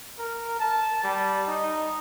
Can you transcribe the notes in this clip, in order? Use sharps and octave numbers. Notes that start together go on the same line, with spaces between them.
A#4
A5
G3
D#4